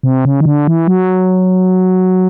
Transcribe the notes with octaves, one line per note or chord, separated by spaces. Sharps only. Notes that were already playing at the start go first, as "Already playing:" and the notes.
C3
C#3
D#3
D3
E3
F#3